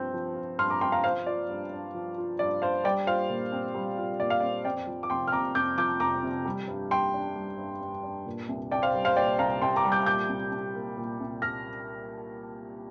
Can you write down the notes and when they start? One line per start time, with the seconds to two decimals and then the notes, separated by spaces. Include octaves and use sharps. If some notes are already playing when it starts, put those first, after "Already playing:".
Already playing: G2 F3 C4 G6
0.14 F3
0.36 F4
0.59 G2 C6 F6
0.70 A#5 D6
0.81 C4 G5 C6
0.92 F5 A#5
1.04 F3 C5 F5
1.26 F4 D5
1.49 G2
1.72 D4
1.94 F3
2.18 F4
2.39 G2 D5
2.62 D4 C5 F5
2.84 G3 D5 G5
3.07 F4 C5 F5
3.29 A#2
3.52 C4
3.75 G3
3.98 F4
4.20 A#2 D5
4.30 F5
4.40 D5
4.43 C4
4.65 F2 D5 G5
4.87 F3
5.03 D6
5.10 F1 G5 C6
5.28 F6
5.32 C3 A#5 D6
5.55 F2 D6 G6
5.78 F3 D6 G6
6.00 F1 A#5 D6
6.23 C3
6.45 G3
6.68 G2
6.91 G2 G5 C6
7.14 D4
7.36 G3
7.58 G2
7.81 G2
8.03 D4
8.26 A#2
8.49 C2
8.71 C2 D5 G5
8.82 C5 F5
8.94 G3
9.05 C5 F5
9.17 A#2 D5 G5
9.39 C2 F5 A#5
9.62 C2 G5 C6
9.76 A#5 D6
9.85 G3
9.92 D6 G6
10.06 A#2 D6 G6
10.29 C2
10.51 C2
10.75 A#3
10.97 A#2
11.20 C2
11.42 F6 A#6